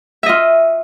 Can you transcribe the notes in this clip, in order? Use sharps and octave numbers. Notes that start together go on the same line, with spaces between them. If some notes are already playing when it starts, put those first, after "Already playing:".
F4 D#5 E5